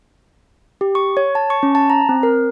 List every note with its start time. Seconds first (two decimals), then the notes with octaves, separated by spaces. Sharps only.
0.81 G4
0.95 C#6
1.17 C#5
1.35 A5
1.50 C#6
1.63 C#4
1.75 A5
1.90 A#5
2.09 C4
2.23 A#4